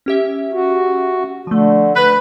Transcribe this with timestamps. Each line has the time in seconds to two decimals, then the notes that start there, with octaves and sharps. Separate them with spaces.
0.06 C#4 G4 E5
0.53 F#4
1.47 D3 F3 A3
1.96 B4